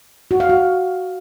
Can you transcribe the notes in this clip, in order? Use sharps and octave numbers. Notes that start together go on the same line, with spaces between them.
F#4
F5
F#4